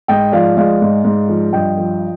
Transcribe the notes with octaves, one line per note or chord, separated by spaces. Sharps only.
G#2 D#5 G5
F3 D5 F5
G#3 D5 F5
G#2
G#2
F3
G2 D#5 G5
F3